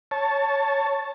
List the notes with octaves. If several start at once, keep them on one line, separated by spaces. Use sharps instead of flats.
C#5 A5